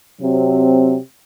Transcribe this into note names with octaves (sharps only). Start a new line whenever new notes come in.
C3 F#3 C4